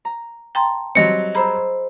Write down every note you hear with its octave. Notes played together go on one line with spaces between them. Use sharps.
A#5
G5 A5 A#5 C6
F#3 G3 C4 D#5 C#7
G#4 C5 A#5 B5 E6